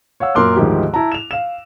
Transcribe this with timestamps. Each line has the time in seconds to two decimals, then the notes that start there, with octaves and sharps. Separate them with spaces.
0.20 C#5 F5 F#5 E6
0.35 F#2 A#2 A#4 C6 D6 F#6
0.56 D2 G#2 D#3 F3 G4
0.94 E4 A5 A#5
1.12 E7 F7
1.31 F5 E7